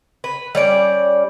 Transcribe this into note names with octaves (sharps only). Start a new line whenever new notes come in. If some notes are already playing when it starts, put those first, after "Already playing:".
B4
G3 C#4 D5